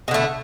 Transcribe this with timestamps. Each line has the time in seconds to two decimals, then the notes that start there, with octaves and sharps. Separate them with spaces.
0.08 B2
0.11 D3
0.14 A3